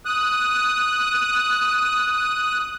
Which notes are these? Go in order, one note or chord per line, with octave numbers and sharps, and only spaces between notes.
D#6 F#6